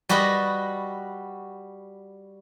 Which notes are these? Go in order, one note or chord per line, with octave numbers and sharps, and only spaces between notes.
G3 F#4 G4 B4 D#5